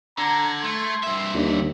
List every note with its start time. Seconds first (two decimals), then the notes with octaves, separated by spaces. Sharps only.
0.18 D3 A#5 G#6
0.63 A3 C6
1.03 G2 E5
1.35 D#2 D#3 D4